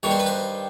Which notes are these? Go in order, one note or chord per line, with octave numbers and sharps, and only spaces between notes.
G2 D#3 G3 C#5
C5
B4
C5